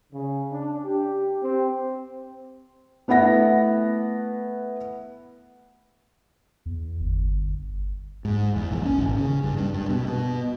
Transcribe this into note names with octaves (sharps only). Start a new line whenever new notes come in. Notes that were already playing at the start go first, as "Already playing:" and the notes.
C#3
D4
G4
C4
A3 B3 E4 F#5 A#6
E2
G1
G#2
E2
A#1
C#4
G#1
C#3
G2
G2
G2
B2
B2